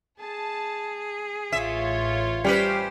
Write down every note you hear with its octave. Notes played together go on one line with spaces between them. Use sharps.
G#4 A5
A1 F4 C#5 E5
G3 C#4 G4 B4 C5